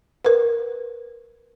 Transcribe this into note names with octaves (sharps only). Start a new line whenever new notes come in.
A#4 B4